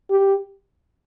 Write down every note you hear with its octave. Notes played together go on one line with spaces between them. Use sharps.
G4